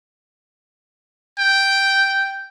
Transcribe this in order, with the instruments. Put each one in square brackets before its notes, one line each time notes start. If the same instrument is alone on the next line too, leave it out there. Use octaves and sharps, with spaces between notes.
[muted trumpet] G5